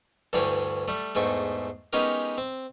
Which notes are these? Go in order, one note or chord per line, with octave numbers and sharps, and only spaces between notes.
D2 G2 E3 C#5 D5 G5
G3 A3
E2 G#2 A3 G5 C#6
G#3 B3 C#4 D#4 G4 A#4
C4